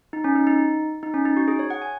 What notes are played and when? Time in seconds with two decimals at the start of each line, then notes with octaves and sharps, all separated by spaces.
0.13 D#4
0.24 C#4
0.35 D#4
0.47 D#4
1.03 D#4
1.14 C#4
1.25 D#4
1.37 F#4
1.48 G#4
1.59 C#5
1.70 F#5
1.82 G#5